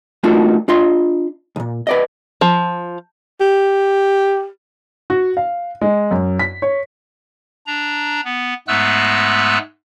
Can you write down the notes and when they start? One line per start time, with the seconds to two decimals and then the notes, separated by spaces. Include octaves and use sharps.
0.23 A3 A#3 D4 D#4 F4 F#4
0.68 D4 F4 D#5 C6
1.56 B1 A#2
1.87 B4 D5 D#5
2.41 F3
3.41 G4
5.10 F#4
5.37 F5
5.81 G#3
6.11 F#2
6.39 B6
6.62 C#5
7.67 D4 A#5
8.25 B3
8.68 G#2 G#3 A3 B3 E6 F#6